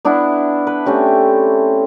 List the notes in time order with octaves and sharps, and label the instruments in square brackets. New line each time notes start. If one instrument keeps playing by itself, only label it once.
[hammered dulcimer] B3 D4 E4
B4
A3 C4 C#4 G4